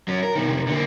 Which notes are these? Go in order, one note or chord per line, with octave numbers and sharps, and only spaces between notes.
F#3 C#4
A#4
B2 D#3
F2 C3
D3 A#3